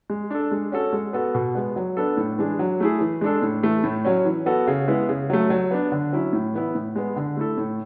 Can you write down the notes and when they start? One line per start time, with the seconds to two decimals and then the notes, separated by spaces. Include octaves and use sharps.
0.10 G#3
0.31 D4 A4
0.51 G#3
0.72 C#4 F#4 A4
0.93 G#3
1.13 B3 F#4 A4
1.35 B2
1.55 G#3 B3
1.76 F#3
1.97 B3 D4 A4
2.17 A2
2.38 E3 G#3 D4 G#4
2.59 F#3
2.80 A3 E4 G#4
3.01 E3
3.21 G#3 D4 A4
3.42 A2
3.63 E3 A3
3.84 A2
4.05 F#3 C#4
4.25 E3
4.46 B3 F#4 A4
4.67 C#3
4.88 G#3 B3 E4
5.09 C#3
5.30 F#3 A3
5.50 F#3
5.71 B3 D4
5.92 D3
6.13 F#3 C#4 E4
6.33 A2
6.54 E3 B3 E4
6.75 A2
6.96 G#3 B3
7.16 D3
7.37 A3 E4 A4
7.58 A2